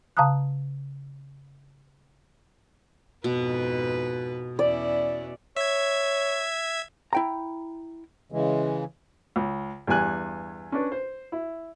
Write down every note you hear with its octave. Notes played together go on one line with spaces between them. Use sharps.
C#3 F5 A5 A#5 D#6 F#6
F2 G#2 B2 B4
E2 C#4 E4 D5
C#5 E5 G#6
E4 G5 A#5
C#3 E3 G#3
C#2
E2 G2 G4 G#5 F#6
C#4 D4 B4
C5
E4